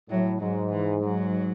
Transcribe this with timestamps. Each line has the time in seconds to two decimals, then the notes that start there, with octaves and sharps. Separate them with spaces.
0.10 A2 F#3
0.41 G#2 F#3
0.71 E3
1.03 F#3